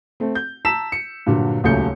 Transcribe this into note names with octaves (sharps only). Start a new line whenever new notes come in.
A3 C4
G6
A5 A#5 E6 B6 E7
C#7
G2 A#2 D3 F#3
D#1 C#2 F#3 A3 G6 C#7